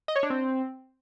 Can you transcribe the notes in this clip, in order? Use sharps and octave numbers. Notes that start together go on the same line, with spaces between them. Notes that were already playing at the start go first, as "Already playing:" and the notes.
D#5
C#5
D4
C4